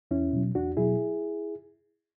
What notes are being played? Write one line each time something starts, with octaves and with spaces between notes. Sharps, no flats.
E2 C#4 E4
B2 F#3
E2 D4 F#4
B2 F#3 E4 G#4